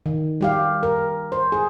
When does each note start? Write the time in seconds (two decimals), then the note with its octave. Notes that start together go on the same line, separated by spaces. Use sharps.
0.06 D#3
0.41 G3 G4 F5
0.83 A#4
1.32 C5
1.52 G#4